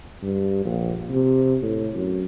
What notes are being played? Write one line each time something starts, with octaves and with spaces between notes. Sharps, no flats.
G2
A#1
C3
A2
F#2